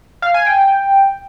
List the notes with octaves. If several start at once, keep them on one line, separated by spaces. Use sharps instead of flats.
F5
G#5
G5